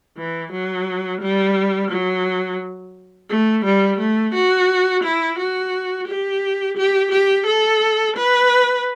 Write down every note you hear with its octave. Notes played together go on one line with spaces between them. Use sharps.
E3
F#3
G3
F#3
A3
G3
A3
F#4
E4
F#4
G4
G4
G4
A4
B4